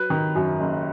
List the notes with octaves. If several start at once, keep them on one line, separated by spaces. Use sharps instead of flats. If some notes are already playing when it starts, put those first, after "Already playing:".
Already playing: F#3 B4
D#3
F#2
F#1